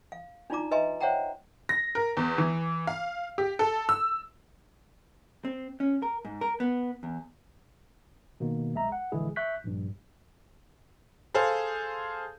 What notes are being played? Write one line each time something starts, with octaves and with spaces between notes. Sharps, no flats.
F5
D4 D#4 F4 D5 A#5 D6
B4 D#5 E5 G#5 A#5 C6
C5 C#5 E5 F#5 G5 A#5
A#6
A#4
E2
E3
F5
G4
A4
E6
C4
C#4
A#4
G#2
A#4
B3
E2
B2 D#3 A#3
B1 G#3 E5 A#5
F#5
A#1 D3 E3 G#3 E4 G#4
E5 C#6 F#6 G6 B6
A#1 G2
G#4 A4 C5 F5